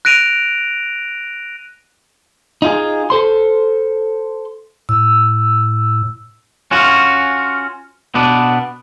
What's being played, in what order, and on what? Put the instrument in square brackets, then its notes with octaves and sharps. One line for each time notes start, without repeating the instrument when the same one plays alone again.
[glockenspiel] F#6 A#6 D7 D#7 F7
[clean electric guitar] D#4 F4 G#4
A4 C5 C6
[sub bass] A2 [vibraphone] E6
[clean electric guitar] C#4 F4 F#4
B2 B3 D4